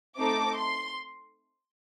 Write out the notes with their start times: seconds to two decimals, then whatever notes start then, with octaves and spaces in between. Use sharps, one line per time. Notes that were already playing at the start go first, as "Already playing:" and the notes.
0.17 A3 C4 D#4 A4 D6
0.57 C6